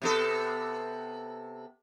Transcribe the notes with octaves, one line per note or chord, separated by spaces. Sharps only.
C3 B3 A4